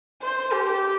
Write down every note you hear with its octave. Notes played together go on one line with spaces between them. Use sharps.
C5
G4